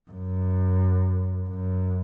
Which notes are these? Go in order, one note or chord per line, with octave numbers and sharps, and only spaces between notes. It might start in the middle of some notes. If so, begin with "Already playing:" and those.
F#2
F#2